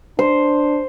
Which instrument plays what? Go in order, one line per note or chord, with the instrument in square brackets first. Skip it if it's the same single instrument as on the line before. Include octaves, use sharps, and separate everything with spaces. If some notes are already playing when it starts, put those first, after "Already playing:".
[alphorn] D4 [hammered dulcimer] C5